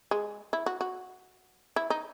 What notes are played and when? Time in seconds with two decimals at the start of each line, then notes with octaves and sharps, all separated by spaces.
0.11 G#3
0.53 E4
0.66 F#4
0.81 F#4
1.76 E4
1.90 D#4